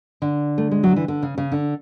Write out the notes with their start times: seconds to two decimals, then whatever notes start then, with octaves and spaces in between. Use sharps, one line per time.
0.22 D3
0.58 A3
0.71 G#3
0.83 F#3
0.96 E3
1.08 D3
1.23 C#3
1.38 C#3
1.52 D3